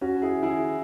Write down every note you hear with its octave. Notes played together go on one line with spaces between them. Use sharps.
C#4 F#4
E4 G#4
E4 G#4